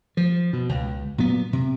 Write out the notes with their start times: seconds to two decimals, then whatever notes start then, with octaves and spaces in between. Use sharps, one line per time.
0.17 F3
0.53 B2
0.69 C#2
1.18 A#2 F#3 B3
1.53 C3